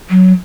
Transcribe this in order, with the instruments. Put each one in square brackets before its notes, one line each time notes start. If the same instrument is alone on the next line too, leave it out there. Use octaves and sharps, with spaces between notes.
[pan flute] F#3